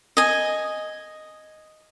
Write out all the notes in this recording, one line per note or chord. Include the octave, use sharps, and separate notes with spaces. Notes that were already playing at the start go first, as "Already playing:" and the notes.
D#5 G#5